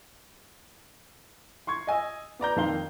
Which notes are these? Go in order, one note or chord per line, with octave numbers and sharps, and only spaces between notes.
C6 C#6 G#6
D#5 G#5 E6
B3 D5 A#5 G6
F2 D#3 A#3 F5 C6 G7